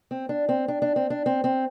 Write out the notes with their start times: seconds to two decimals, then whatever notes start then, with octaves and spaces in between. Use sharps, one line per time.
0.11 C4
0.29 D4
0.49 C4
0.68 D4
0.82 D4
0.96 C4
1.10 D4
1.26 C4
1.44 C4